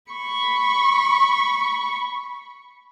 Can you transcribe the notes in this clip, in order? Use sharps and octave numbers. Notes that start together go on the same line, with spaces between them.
B5 C#6